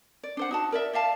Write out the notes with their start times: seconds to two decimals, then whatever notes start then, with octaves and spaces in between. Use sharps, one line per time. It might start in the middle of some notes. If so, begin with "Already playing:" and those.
0.23 D5
0.37 D4 C5 F#5
0.51 D#4 F#4 A5
0.72 A#4 D5 E5
0.93 D5 E5 F5 A5